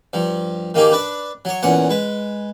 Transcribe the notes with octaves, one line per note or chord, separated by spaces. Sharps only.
G2 F3
D#3 A#3 D#4 G4 G#4
D4 B4 D5
F#3 C#5
E2 A#2 C#4 F#5
G#3 B4